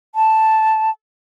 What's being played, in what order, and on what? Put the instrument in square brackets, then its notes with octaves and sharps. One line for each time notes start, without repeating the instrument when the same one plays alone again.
[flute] A5